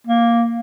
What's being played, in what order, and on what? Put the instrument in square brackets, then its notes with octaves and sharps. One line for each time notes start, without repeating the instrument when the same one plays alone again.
[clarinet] A#3